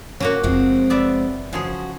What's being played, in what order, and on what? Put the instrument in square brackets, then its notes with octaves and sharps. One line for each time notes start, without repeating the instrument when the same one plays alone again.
[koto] F#3 A#3 F#4 [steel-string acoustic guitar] C#4
[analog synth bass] F#1 [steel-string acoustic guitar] F3 G#3 C4
[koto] B3 D5 E5
[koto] C#3 F3 G#4 [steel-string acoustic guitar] F#4